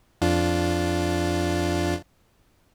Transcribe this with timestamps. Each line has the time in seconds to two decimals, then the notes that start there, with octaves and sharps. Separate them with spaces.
0.22 F2 D4 F4